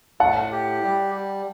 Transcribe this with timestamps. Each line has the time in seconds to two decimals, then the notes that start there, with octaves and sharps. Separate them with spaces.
0.20 A2 F#5 A5
0.52 G4
0.83 G3